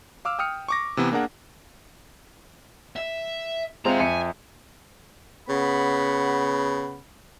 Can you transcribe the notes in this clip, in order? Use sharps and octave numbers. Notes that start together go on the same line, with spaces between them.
F5 D6 E6 F6
G5 D#6 F6 C#7
C#6 D6 A#6
C3 E3 B3
A#3 D4 G#4 A#4 F#5
E5
G#3 C4 F4 E5 A#5
F2 E5 G#5 C#7
C#3 B3 F#5 B5